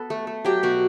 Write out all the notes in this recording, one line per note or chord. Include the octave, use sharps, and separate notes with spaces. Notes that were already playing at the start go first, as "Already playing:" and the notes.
Already playing: B3 A4 B4
A3
A3
F#3 G4
B2 F#4